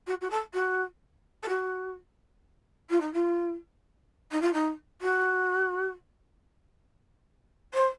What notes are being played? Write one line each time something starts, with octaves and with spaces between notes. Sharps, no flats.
F#4
F#4
A4
F#4
A4
F#4
F4
D#4
F4
D#4
F4
D#4
F#4
C5